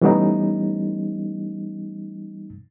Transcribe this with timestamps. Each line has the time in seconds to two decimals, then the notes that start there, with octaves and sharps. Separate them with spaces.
0.01 E3 G3 A3 B3 C#4 D#4